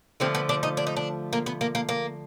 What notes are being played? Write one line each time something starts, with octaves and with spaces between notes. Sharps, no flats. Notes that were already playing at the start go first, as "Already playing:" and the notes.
D3 F3 A3 C4
B3
D4
D#4
D4
D#4
D4
A#3
B3
A#3
A#3
A#3